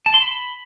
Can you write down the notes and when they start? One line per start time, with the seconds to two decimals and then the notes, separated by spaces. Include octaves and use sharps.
0.06 A5
0.14 C6
0.22 B5